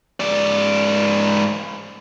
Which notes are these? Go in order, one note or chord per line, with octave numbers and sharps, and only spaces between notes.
G#2 D5